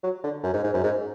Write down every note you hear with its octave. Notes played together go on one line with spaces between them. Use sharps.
F#3
D3
F#2
G#2
G#2
F#2
G#2